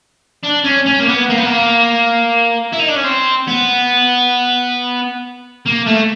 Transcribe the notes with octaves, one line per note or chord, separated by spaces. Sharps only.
D4
C#4
C#4
A#3
B3
A#3
B3
A#3
E4
D#4
D4
C#4
C4
B3
A#3
A3